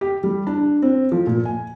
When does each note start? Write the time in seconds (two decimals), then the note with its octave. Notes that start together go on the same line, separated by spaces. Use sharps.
0.01 G4
0.23 G3
0.47 D4
0.82 C4
1.12 F3
1.27 A#2
1.45 G#5